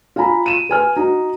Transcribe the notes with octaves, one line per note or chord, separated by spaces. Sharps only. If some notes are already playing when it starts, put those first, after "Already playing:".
F4 F5 G#5 A#5 B5
D#7 E7
B4 G#5 F6
D#4 F#4